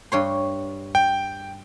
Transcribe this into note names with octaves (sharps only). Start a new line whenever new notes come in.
G2 C#5 C6
G5